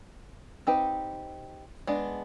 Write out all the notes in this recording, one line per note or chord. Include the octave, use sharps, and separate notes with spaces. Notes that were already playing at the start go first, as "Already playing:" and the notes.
C4 D#4 G4 B4
G#3 B3 D4